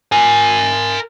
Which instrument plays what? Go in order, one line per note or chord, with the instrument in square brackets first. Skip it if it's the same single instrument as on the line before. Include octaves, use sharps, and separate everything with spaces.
[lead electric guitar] A#4 G#5